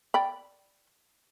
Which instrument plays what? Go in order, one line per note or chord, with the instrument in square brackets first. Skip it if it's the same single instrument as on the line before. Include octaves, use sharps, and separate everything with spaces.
[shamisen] D5 G5 B5